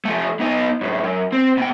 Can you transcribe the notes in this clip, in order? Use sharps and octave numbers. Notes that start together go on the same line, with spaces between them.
F3 A3
B3 D#4
F#2 A2
F#2
C4
B2 G5